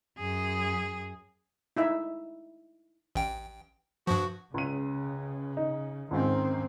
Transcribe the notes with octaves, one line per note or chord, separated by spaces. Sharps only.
F#2 G#4
D#4 E4 E5
A1 G5
G2 F3 F#4
C#2 C#3 D#7
D#4
C#2 G#2 D#3 C4